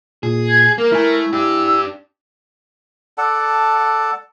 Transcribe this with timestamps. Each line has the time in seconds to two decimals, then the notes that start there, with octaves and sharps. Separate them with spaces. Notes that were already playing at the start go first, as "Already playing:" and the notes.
0.23 A#2 G#4
0.49 G#6
0.78 A#3 A#4
0.92 A3 E4 G#5
1.33 D4 G4 E6
3.18 A4 D5 F#5 A5